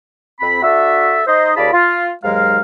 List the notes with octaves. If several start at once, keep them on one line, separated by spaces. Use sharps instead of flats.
F2 C4 B5
D4 F#4 A4 E5
D#4 C5 D#5
D#2 F4 G#4 D5 A5 B5
F4
D#2 G#2 F#3 G#3 A#4 F5